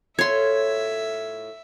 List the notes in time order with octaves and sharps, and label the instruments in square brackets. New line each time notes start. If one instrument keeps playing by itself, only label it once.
[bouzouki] A2 F4 [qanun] C#5 C6 [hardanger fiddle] E5 [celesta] G#6